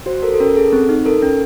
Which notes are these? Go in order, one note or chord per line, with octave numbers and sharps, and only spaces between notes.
F#4 C5
A4 A#4
A4
C#4 A#4
G#4 A4
C4
D#4
A4 A#4
C#4